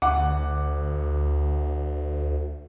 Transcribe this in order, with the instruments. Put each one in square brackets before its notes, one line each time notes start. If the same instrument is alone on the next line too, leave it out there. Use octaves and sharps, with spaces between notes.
[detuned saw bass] D2 [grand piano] F#5 D6